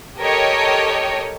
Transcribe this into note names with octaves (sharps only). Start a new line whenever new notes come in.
G4 A4 A#4 C#5 D#5 G5